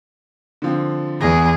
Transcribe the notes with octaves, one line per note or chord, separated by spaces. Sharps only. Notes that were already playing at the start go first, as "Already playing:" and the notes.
D3 F3 C4
E2 G#4 A#6